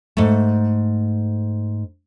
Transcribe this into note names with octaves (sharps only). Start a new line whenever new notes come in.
G#2 A3